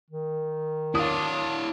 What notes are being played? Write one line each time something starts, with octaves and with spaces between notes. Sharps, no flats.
D#3
D4 E4 C#5 F5 D#6